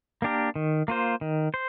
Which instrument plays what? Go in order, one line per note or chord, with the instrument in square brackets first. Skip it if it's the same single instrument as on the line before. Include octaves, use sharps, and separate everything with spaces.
[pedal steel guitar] A#3 D4 G4 A#4
D#3
A#3 F4 C5
D#3
C5